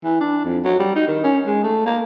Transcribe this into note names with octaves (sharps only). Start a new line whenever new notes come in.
E3
D4
F2
F#3
G3
D#4
D#3
C#4
G#3
A3
A#3